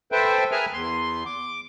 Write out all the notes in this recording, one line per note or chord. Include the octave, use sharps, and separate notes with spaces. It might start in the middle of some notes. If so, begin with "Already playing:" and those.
A4 B4 C5 E5 G5
G#4 A#4 B4 E5 G#5 F6
E2 C6
D6